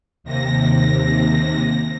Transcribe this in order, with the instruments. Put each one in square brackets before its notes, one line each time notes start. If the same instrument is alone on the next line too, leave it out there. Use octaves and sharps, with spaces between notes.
[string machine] D#2 C3 A#6